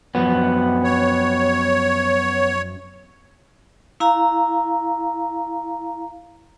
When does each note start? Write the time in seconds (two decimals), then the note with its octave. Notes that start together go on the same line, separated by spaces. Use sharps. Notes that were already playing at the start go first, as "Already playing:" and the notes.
0.15 F#2 F3 F#3 B3
0.84 C#5
4.00 E4 F5 A#5